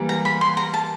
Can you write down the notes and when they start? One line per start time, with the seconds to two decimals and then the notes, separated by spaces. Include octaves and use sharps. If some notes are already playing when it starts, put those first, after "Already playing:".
Already playing: E3 G3 A#3
0.09 A#5
0.25 B5
0.41 C6
0.57 A#5
0.74 A5